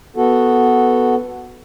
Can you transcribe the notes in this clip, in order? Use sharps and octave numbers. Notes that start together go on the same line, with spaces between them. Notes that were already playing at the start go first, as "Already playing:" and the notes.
B3 F#4 A4